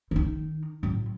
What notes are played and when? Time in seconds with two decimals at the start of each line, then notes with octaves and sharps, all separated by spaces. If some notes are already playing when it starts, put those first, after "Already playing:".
0.11 D#3 D#4
0.83 A2 F#3